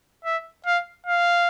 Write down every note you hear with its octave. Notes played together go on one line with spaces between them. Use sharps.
E5
F5
F5